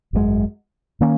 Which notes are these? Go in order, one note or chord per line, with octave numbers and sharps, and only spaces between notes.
G#1 F#2 C#3 G#3
D#3 A#3 C#4